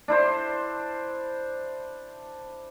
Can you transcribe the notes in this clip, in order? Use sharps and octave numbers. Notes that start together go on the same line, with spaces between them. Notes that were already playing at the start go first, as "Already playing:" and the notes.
D4 E4 C5